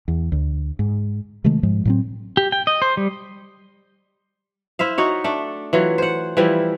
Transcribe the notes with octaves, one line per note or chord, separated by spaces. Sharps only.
E2
D2
G#2
C3 D#3 G#3 A3
G#2 F3 G#3
A2 F#3 C4
G4
G5
D#5
C5
G3
E4 C5 E5 F5
D#4 F#4 C#5
A3 D4
E3 F#3 F4
C5 F#5
E3 F3 G3 E4